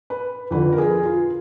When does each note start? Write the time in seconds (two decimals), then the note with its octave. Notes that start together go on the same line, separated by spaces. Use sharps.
0.10 B4
0.51 F2 D3 F3 B4
0.72 A#4
0.78 G#4
1.05 F4